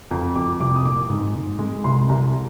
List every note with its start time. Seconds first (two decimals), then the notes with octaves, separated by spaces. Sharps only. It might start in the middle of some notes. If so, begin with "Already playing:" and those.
0.11 F2 A#5
0.36 F2 D6
0.60 C2 D6
0.76 D#6
0.84 A#2 D6
1.10 G#2
1.35 G#2
1.59 G#3
1.84 C2 C6
2.09 C2 A#5